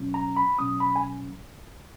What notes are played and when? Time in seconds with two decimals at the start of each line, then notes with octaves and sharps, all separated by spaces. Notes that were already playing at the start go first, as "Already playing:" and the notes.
Already playing: B2 F#3 C#4
0.14 A#5
0.37 B5
0.58 B2 F#3 C#4 D#6
0.80 B5
0.96 G#5